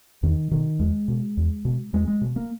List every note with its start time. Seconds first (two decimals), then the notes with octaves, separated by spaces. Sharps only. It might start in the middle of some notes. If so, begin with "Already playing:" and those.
0.23 E2 D#3
0.51 B2 D#3
0.79 E2 G#3
1.08 B2
1.37 E2
1.65 B2
1.93 E2 G#3
2.08 G#3
2.21 B2
2.36 A#3